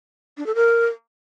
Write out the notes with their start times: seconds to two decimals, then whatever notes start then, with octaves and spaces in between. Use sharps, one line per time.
0.37 D4
0.46 A4
0.55 A#4